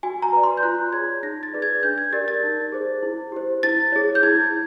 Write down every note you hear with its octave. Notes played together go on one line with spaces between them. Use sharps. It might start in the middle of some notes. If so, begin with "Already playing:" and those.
F#4 G#5
A#5
B4 D5
C6
G6
F4 F#6
G#4 C#5 G#6
D#4 A#6
A6
G#4 B4 D5
G#6
D4 G6
G#6
G4 A#4 D5 A6
A6
D#4
G#4 C5
E4
G4 C5
E4 A6
G#4 C#5
G6
E4 G#6